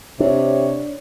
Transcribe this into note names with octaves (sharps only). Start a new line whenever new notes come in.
C3 D4 C#5